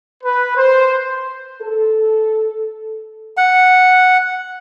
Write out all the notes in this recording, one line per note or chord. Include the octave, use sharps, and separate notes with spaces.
B4
C5
A4
F#5